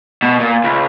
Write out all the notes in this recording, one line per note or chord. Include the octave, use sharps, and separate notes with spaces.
B2
A#2
C#2